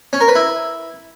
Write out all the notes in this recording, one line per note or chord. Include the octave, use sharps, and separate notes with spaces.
C#4
A#4
B4
E4